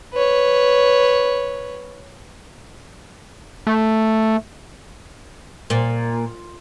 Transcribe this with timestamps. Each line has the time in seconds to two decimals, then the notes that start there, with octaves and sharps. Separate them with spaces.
0.13 B4 C#5
3.67 A3
5.70 A#2